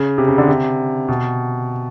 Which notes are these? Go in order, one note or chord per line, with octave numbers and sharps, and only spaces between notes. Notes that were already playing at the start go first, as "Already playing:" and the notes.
Already playing: C#3
C3
C#3
D3
C3
B2